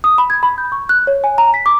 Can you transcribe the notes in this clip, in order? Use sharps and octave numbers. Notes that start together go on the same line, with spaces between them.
D#6
B5
G#6
B5
G6
C#6
F#6
C#5
G#5
A#5
B6
D6